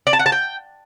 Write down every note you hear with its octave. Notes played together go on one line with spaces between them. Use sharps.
D5
A5
F#5
A5
G5